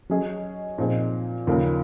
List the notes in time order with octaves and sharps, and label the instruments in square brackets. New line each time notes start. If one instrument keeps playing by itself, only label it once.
[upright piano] F#3 C#4 G#4 D#5
A#2 F3 C4 D#4 G#4
D#2 C#3 F3 A#3